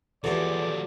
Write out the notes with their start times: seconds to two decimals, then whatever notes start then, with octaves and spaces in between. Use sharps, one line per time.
0.24 E2 F3 F#4 G4 A4 D5